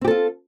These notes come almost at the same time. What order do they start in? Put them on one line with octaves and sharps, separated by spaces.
C4 G4 A4 F4